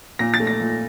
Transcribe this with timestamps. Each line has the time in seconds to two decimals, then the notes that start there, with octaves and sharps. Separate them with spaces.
0.19 A#2 A#6
0.34 A6
0.40 A3
0.47 A#6
0.60 A#2